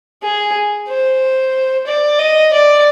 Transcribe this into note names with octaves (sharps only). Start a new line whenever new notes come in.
G#4
C5
D5
D#5
D5